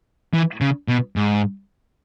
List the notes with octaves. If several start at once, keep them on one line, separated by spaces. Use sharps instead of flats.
E3
C#3
B2
G#2